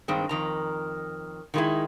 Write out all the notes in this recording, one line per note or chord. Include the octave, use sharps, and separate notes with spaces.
G2 D#3 G#3 C4
F2 D#3 A#5
D#3 F#3 G#3 A3 D#4 E4